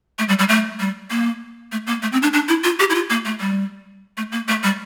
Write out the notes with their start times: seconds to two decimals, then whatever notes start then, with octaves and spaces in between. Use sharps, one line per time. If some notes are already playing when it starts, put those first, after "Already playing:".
0.19 A3
0.29 G3
0.39 G3
0.49 A3
0.80 G3
1.10 A#3
1.72 A3
1.87 A#3
2.03 A3
2.12 C4
2.23 D4
2.33 D4
2.48 E4
2.64 F4
2.80 G4
2.90 E4
2.95 F4
3.10 A#3
3.25 A3
3.40 G3
4.17 A3
4.32 A#3
4.48 A3
4.64 G3